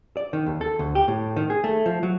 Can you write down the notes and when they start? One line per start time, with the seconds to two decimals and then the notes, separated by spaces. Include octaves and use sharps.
0.17 D5
0.33 D#3
0.46 D#2
0.61 A4
0.79 D2
0.95 G4
1.08 A2
1.36 D#3
1.50 G#4
1.64 A3
1.86 F3
2.03 F#3